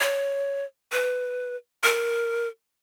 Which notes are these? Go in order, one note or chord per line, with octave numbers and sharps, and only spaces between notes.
C#5
B4
A#4